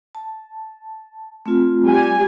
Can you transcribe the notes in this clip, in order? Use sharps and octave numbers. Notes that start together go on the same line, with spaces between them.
A5
A3 C4 F4
G3 G4 G#5